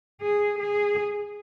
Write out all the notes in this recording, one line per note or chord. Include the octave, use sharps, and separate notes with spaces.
G#4
G#4